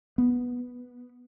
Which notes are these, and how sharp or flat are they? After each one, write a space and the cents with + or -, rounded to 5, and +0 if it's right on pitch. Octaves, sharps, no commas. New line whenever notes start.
B3 -5